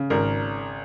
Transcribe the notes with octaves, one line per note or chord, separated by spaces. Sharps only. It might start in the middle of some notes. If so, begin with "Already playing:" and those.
Already playing: C#3
G#1 A#4